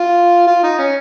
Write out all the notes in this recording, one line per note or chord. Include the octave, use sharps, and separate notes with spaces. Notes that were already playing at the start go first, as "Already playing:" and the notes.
Already playing: F4
F4
D#4
C#4